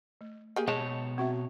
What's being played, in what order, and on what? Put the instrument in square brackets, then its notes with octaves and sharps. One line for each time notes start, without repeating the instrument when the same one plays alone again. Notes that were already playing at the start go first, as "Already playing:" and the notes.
[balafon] A3
[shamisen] A#3 G4 G#4
[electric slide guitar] B2 C#5 A5 [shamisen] G#3
[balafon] C4 F#4 E5